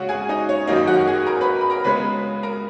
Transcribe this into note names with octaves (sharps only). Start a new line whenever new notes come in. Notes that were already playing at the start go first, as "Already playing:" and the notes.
Already playing: C#3 G#3 F#4 F#5
G#4 G#5
D#4 D#5
C#5
F#2 D#3 F#3 A#3 D#4 D#5
F#4 F#5
G#4 G#5
A#4 A#5
B4 B5
B5
A#4 A#5
C#3 G#3 B3 B4 B5
A#4 A#5